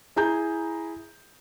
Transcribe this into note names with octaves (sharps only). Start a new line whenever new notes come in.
E4 G#4 A#5 G6